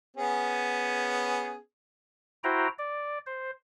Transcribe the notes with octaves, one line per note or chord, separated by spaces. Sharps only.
B3 C#4 G#4
E4 F#4 C5 G5 A#5
D5
C5